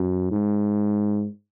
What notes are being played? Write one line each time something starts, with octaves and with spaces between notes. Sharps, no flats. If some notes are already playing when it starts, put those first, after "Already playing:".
Already playing: F#2
G#2